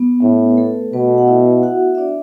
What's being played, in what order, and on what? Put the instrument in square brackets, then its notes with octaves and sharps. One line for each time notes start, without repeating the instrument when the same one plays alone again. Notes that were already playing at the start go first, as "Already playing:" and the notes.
Already playing: [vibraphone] B3
[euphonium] A2 [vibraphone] C#4
[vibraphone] B4
A3 A4
[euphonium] B2 [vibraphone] B3 B4
[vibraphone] F#5
E4 E5
F#4 F#5
E5
D4 D5